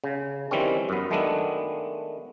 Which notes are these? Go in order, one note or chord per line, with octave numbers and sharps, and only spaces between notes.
C#3
D#3 E3 G3 C4 C#4
F#2 B3
D#3 G#3 A3 B3 D4